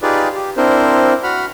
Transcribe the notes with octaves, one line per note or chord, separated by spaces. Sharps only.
D#4 F4 G4 G#4 B4 D5
G4
C4 D4 E4 A#4 C5
F#4 F#5 B5 F6